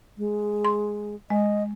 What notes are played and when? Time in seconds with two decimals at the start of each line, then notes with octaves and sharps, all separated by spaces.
0.18 G#3
0.65 C6
1.30 G#3 D#5